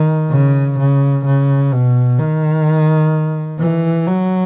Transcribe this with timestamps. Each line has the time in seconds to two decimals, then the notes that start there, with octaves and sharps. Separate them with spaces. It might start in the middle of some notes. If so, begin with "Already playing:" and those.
Already playing: D#3
0.31 C#3
0.78 C#3
1.26 C#3
1.72 B2
2.18 D#3
3.59 E3
4.07 F#3